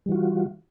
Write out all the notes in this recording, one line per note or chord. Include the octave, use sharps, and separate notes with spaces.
E3 G3 F4 F#4